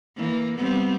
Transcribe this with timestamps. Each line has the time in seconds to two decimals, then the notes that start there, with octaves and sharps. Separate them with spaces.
0.16 E3 A#3
0.57 G3 B3 C4